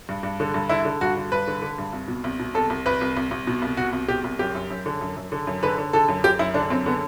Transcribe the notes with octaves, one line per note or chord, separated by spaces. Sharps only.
G2
G2
D3
G2
D3 E4
D3
G2 F#4
D3
G2 B4
D3
D3
G2
C2
B2
C2
B2
C2 A4
C2
C2 B4
C2
C2
C2
B2
C2
B2 F#4
C2
B2 G4
C2
F#2 G4
F#2
F#2
D3
F#2
F#2
D3
F#2
D3 B4
D3
D3 A4
F#2
F#2 G4
F#2 E4
D3 D4
F#2 C4
D3 B3